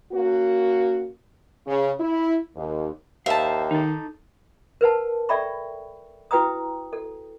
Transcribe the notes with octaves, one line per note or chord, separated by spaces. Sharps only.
A#3 C#4 F#4
C#3
E4
D#2
D#2 C5 E5 F5 A5
D#3 D#4 A4
A#4 B4 F#5 A5
A4 D5 E5 G5 B5 C#6
E4 F#4 B4 G5 A#5 D#6
A4